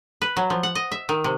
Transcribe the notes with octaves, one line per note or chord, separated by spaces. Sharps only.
B4
F#3
F3
F#5
D#5
E5
D#3
C3